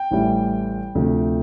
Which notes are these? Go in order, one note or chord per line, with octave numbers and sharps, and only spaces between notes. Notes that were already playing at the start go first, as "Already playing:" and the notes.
Already playing: G5
A1 A2 E3 G3
D2 C3 F3 A3